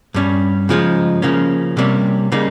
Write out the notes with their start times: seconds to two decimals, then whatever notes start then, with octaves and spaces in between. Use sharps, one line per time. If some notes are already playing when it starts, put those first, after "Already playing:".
0.14 G2 G3 C#4
0.69 C#3 F3 G#3 D#4
1.22 C#3 F3 A#3 C#4
1.77 C3 G3 A#3 C#4
2.32 C#3 G3 A#3 D#4